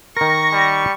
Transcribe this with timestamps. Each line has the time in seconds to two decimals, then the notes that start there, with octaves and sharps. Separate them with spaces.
0.17 D#3 A#4 C#6 A#6
0.52 G3